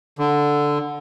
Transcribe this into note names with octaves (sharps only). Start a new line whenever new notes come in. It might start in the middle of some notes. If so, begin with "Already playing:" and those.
D3